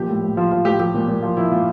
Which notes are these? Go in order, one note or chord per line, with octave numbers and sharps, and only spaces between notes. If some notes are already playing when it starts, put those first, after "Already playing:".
Already playing: A#2 F3 G4
A2
A2
F3 F4
F3 F4
A2 G4
F3 G4
A#2
A#2
F3 F4
F3 E4
A#2 F4